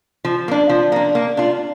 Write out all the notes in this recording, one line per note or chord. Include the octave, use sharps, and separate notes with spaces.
F3
A#3 D4
F3
A#3 D4
A#3
D4 F4